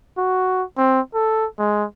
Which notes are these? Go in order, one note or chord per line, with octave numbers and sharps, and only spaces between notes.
F#4
C4
A4
G#3